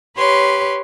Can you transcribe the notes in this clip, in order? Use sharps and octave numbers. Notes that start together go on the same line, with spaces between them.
G4 B4 C#5 C6